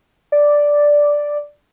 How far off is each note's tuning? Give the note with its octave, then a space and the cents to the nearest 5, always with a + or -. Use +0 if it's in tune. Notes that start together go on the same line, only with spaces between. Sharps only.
D5 +0